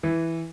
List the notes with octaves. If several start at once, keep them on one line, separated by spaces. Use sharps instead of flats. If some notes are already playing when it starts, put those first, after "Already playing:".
E3